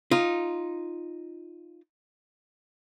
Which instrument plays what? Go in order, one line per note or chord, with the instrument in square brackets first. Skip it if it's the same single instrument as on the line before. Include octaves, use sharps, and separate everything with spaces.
[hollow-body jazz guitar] D#4 F4